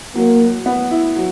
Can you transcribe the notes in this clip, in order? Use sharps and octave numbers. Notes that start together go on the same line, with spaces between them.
F#3 A#3
F#3
B3
E4
F#3